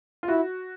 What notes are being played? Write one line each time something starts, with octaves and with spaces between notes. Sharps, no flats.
F4
E4 F#4